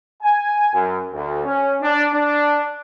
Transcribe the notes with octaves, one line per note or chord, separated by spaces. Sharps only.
G#5
F#2
D2
C#4
D4
D4